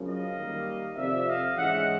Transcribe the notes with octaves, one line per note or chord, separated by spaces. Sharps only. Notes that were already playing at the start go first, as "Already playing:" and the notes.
Already playing: F#2 C#3 F3
D#5 F5
D#3 G3 A#3
F2 C3 F3 D5 E5
D#5 F5
G#2 E3 G#3 C#4 E5 F#5